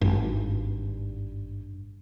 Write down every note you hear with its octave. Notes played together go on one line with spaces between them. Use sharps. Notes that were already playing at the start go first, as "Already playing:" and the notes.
G#1 G2